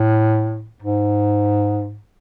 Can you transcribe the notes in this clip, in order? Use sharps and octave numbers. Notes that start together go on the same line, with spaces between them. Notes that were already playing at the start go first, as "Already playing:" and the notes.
Already playing: A2
G#2